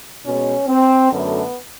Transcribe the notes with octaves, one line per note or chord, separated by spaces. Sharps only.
B2 G#3 C#4
C4
F#2 D3 F#3 A3 B3